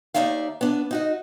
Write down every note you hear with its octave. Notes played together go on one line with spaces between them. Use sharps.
D#2 C#3 D#4 D5 E5 F5
B3 D4
D#4 F#4 D#5